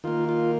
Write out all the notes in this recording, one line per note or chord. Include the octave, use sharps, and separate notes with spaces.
D#3 A#3 F4
F4